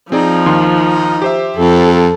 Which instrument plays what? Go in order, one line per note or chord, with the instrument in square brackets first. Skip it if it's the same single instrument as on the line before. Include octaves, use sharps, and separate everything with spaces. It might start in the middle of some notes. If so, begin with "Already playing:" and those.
[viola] F3 [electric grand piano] C4 G#4 D5 [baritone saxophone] D#4
[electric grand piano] D#2 D#3 C6
G4 C5 E5
[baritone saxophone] F2 [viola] A4